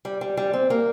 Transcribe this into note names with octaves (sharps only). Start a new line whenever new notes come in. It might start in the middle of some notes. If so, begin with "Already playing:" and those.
G3
G3
G3
C4
A#3